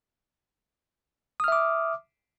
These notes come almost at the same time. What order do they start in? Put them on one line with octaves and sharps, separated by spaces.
D#6 F6 E5 D6